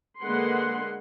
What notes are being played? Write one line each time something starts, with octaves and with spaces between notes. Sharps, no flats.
D3 G#3 A#3 B4 F#5 C6